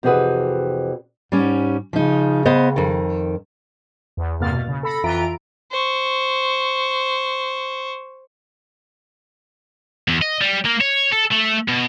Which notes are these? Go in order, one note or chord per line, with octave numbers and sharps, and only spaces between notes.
F2 C3 E3 F#4 G#4 B4
G#2 G3 C#4
C#3 F3 D#4
B3 C5 D#5
F2 D#3
E2
E2 G2 C3 A#3 F6 A6
B2
C#3
A4 B5 A#6
F2 E3 F4 E5 A#5 D7
C5 C#6
E2
D#5
G3
A#3
C#5
A4
A3
B2